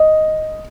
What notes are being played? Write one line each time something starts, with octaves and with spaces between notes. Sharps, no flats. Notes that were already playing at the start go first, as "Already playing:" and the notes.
Already playing: D#5